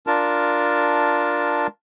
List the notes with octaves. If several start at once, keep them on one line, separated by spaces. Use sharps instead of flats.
D4 F4 A#4 A5